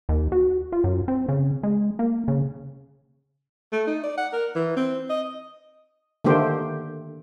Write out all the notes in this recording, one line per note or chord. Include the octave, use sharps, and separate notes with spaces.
D#2
F#4
F4
F#2
C4
C#3
G#3
A#3
C#3
A3
D#4
D5
F#5
A#4
E3
C4
D#5
D3 D#3 A3 A#3 G4 C5